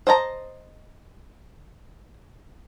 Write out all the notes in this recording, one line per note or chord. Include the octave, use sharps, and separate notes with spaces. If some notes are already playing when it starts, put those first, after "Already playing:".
C5 D#5 A5 A#5